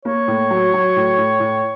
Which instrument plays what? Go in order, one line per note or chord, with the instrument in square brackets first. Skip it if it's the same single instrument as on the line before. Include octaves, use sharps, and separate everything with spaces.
[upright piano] A#3 [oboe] C#5
[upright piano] A2
F#3
F#3
A2
A2
A2